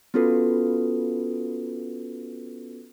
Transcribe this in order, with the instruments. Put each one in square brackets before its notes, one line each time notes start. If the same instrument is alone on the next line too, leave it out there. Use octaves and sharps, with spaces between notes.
[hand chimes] B3 C#4 F4 F#4 A4 B4